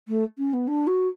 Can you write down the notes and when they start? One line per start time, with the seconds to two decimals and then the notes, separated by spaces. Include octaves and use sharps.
0.08 A3
0.38 C#4
0.53 B3
0.67 D4
0.87 F#4